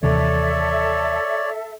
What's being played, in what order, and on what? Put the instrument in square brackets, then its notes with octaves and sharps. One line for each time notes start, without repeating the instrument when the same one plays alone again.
[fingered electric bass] D#2 C3 E3 [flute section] A4 E5 [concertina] C#5 D5